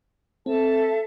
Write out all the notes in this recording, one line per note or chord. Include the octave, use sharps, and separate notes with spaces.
C4 A4 E5 A5